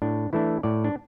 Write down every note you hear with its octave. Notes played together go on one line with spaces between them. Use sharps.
A2 D4
E3 A3 D4 E4
A2 D5
D4